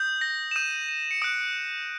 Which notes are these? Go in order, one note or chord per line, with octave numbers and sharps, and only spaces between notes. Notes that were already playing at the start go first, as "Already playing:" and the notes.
Already playing: D#6 G6
A#6
E7
D#6 G6 D#7
D#7
C#7
D#6 F#6 D7